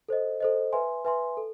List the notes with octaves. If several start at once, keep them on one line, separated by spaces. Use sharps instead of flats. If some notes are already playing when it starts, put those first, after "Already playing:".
A4 C5 D#5
A4 C5 D#5
B4 E5 G#5 C6
B4 E5 G#5 C6
A4